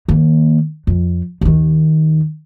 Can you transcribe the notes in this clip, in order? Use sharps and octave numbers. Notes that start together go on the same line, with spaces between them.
D#3 A#3
F2
D#2 D#3